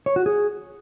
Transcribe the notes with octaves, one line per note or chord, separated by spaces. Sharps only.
C#5
F#4
G#4